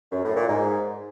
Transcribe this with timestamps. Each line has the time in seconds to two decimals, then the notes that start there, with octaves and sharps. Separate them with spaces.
0.12 F#2
0.24 A2
0.35 A#2
0.47 G#2